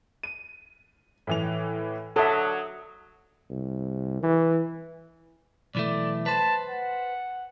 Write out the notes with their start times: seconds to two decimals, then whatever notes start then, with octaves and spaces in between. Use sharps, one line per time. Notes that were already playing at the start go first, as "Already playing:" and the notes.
0.23 D#7
1.27 A2 E3 F7
2.16 D3 F#3 A4 E5 D#6
3.50 C2
4.23 E3
5.75 B1 E3 A3 D5
6.26 B4 C5 A5
6.69 F#5